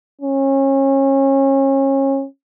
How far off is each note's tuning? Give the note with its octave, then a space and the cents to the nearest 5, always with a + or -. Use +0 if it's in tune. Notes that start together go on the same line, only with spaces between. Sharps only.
C#4 -30